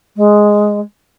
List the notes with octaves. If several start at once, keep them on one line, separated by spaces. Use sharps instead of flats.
G#3